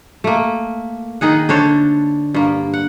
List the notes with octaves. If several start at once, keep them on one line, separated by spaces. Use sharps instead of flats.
A3 A#3
D#3 D#4 G#4 F#5
D3 D4 C5 C#5
G2 A#3
F#5